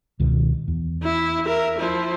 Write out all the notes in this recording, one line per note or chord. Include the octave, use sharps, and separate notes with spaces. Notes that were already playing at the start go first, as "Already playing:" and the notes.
C#2 B2 D#3
E2
E4
A#4 E5
F3 E4